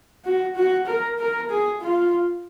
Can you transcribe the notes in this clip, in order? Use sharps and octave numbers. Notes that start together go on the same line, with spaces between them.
F#4
F#4
A#4
A#4
G#4
F4